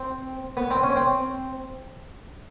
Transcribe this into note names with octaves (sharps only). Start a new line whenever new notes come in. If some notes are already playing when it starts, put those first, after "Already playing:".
Already playing: C4
B3
C4
C#4
C4